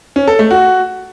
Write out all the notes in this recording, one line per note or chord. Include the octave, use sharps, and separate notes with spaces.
C#4
A4
A3
F#4